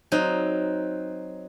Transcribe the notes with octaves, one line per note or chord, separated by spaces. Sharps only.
F#3 C4 D#4